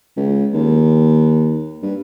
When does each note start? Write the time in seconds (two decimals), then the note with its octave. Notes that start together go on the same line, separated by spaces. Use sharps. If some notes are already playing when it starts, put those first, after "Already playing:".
0.16 C#2
0.53 D#2
1.82 G2